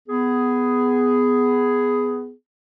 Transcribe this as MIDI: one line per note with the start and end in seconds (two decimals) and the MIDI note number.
0.09 2.33 59
0.09 2.33 68